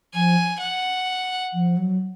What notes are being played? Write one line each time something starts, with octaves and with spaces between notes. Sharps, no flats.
F3 G#5
F#5
F3
F#3